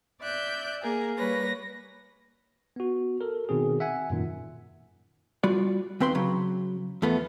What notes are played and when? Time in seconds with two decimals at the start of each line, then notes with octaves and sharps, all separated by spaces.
0.20 D5 E5 F#6 G6
0.82 A#3 G#4 A#4
1.17 G3 A#3 B4 C#5 A#6
2.76 B3 F#4
3.21 A4 A#4
3.49 B2 D#3 C4 G#4
3.80 E5 F#5 G#5
4.10 F#2 A#2 D#3
5.43 G3 F4 F#4 D5
6.00 D#2 C4 B4 G5 C6
6.15 C#3 F#3
7.02 E2 F3 A3 B3